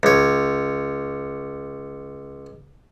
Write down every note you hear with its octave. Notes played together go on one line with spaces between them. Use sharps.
C#2 C#5